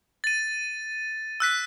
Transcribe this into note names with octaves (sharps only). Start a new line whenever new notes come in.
A6 D#7
E6 F#6 B6